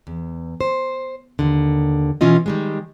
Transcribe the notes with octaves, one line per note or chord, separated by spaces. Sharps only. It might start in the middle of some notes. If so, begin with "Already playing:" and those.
E2
C5
D#2 D3
B2 E3 C#4 F4 D#5
D#3 G3 G#3